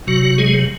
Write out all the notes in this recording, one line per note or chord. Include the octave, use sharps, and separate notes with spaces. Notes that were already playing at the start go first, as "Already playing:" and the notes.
C3 F#3 F#4
G#3 G#4